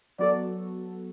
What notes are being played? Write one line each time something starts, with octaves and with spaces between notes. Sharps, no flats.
F#3 B3 F#4 A4 D5